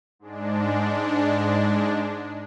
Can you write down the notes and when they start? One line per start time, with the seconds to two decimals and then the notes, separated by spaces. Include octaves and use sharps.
0.19 G#2 G#3 D4